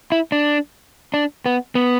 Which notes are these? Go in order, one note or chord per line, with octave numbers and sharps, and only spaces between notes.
E4
D4
D4
B3
B3